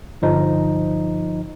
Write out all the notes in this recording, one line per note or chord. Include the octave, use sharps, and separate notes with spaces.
G1 F3 D#4